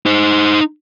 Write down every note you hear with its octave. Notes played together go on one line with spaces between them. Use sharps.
D#4 C5